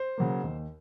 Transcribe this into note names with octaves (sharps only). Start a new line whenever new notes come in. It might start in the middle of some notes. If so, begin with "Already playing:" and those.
Already playing: C5
C#3 F#3 A#3
D#2